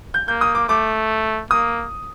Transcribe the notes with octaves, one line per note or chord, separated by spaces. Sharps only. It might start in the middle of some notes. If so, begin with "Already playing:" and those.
G6
A#3 G6
D#6
D6
A3 D6
A#3 D#6